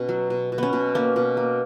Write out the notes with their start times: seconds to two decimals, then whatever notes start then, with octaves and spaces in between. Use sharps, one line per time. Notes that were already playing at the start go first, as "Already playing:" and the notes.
Already playing: B2 C#4
0.09 F#3
0.30 B2
0.52 B2
0.58 B3 C#4
0.73 B2
0.95 A#3 C#4
1.16 B2
1.37 A#3